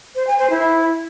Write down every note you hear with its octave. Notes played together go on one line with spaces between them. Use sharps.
C5
G#5
C5
E4